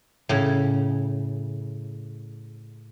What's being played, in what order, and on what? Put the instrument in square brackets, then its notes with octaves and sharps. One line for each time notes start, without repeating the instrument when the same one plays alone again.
[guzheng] A2 C#3